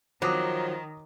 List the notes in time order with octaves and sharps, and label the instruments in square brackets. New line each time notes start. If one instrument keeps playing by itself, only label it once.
[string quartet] D#3 [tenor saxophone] F3 [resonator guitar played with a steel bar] F#3 [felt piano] D6 D#6